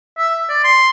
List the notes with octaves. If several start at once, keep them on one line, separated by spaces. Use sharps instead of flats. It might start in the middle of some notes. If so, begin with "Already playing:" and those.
E5
D5
C6